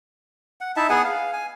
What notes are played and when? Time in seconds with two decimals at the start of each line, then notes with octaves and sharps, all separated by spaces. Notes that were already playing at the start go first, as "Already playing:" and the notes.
0.61 F#5
0.76 D#4 E4 E5 A5
0.90 B3 G#4 F#5 G#5
1.04 F5
1.33 G#5